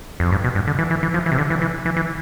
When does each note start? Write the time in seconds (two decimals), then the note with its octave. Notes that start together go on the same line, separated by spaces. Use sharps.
0.20 F2
0.32 G2
0.44 B2
0.55 G2
0.67 D3
0.79 E3
0.91 E3
1.03 E3
1.14 F3
1.26 E3
1.32 C3
1.38 D3
1.50 E3
1.62 E3
1.86 E3
1.97 E3